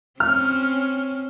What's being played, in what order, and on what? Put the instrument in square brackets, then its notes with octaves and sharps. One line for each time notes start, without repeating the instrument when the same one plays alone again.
[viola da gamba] C4 C#4 [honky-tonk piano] F6